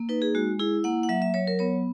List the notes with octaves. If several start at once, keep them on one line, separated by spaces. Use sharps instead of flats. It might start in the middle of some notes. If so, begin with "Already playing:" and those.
Already playing: A#3
D#4 B4
G#4
G#3 F#4
E4 G#4
A#3 F#5
F#5
F#3 E5
E5
F#3 C#5
A#4
B3 C#5